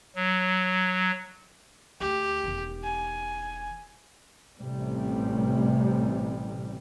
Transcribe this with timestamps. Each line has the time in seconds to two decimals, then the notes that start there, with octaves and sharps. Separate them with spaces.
0.16 F#3
2.00 D2 G4
2.44 E1 D#3
2.83 G#5
4.58 A1 C3 G3